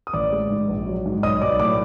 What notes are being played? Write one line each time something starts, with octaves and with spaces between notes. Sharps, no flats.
D#6
A1 D5 D6
G#3
G#2
A#1
F#3
G#2
B1 D#5 D#6
B1 D5 D6
A2 D5 D6